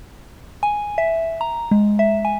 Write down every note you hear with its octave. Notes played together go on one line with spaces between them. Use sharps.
G#5
E5
A#5
G#3
E5
G#5